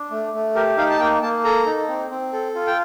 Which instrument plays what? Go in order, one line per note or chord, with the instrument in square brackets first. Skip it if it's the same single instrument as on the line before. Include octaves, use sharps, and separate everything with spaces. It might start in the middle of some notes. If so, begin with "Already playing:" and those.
Already playing: [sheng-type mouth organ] D4
A3
A3
G4 A#4
D#4 F5
A5
A#3 G5
A#3 A5
A4 A#5
D#4
C4
C4
A4
F4
G5